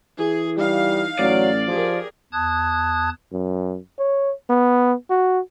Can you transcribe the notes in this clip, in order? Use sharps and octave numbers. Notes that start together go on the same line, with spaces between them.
E3 G#4
G3 D#4 F5
A1 F#3 D5
F3 G4 G#4 A#4
E2 A5 D#6 F#6 G#6
F#2
C#5
B3
F#4